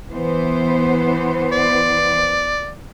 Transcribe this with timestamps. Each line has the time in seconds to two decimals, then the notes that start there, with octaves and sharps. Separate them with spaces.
0.11 E3 B3 C5
1.52 D5